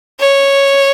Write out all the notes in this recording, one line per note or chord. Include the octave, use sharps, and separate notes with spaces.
C#5